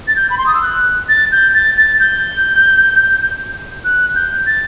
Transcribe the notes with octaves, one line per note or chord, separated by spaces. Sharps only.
A6
G6
B5
C6
D#6
E6
F#6
A6
G6
A6
A6
G6
F#6
G6
A6